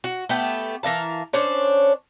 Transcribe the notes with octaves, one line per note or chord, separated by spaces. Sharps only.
F#4
A3 B3 G4
E3 A#4 F5 A5
C#4 D4 C5 C#5